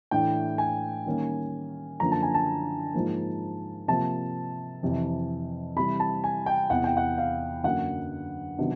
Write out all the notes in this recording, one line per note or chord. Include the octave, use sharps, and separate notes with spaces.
A2 E3 A3 D4 G5
G#5
D#3 G3 A#3 C#4
F#2 D3 F3 A#3 A#5
A5
G#5
A5
G#2 F3 A#3
C3 F3 A#3 A5
F2 C3 E3
C3 E3 G3 B5
A5
G#5
G5
E2 C3 E3 F#5
G5
F#5
F5
F#2 D3 F#3 A#3 F#5
C3 D#3 F#3 B3 D4